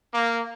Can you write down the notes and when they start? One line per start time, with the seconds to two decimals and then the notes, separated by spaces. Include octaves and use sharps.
0.14 A#3